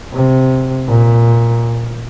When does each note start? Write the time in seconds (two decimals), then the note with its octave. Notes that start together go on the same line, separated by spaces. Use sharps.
0.13 C3
0.87 A#2